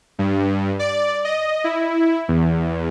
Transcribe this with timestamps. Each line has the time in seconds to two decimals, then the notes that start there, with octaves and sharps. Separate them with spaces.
0.19 G2
0.79 D5
1.25 D#5
1.64 E4
2.28 E2